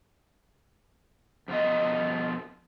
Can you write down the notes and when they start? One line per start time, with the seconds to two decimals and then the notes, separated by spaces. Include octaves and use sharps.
1.48 F2 B2 F4 D#5